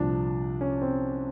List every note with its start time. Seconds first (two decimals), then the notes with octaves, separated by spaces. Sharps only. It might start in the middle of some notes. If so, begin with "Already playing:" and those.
Already playing: C2 A#2 F3 D4
0.61 C#4
0.82 C4